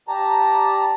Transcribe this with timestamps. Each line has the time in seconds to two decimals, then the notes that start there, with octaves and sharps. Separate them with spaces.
0.08 G4 D5 A5 A#5